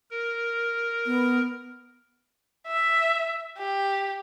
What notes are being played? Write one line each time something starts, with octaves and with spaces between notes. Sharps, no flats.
A#4
B3
E5
G4